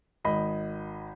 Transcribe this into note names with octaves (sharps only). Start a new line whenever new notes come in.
G#1 D#5 B5